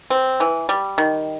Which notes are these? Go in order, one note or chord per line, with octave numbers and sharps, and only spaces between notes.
C4
E3
G3
D#3